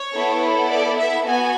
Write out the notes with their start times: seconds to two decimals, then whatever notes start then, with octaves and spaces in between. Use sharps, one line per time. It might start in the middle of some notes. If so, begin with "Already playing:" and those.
Already playing: C#5
0.14 B3 E4 A4
0.70 D5
0.98 E5
1.26 B3 F#4 G#5